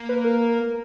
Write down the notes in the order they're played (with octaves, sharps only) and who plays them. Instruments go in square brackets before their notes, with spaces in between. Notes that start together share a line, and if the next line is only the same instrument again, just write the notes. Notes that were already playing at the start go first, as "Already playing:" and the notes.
Already playing: [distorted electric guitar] A#3
[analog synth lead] B4
A#4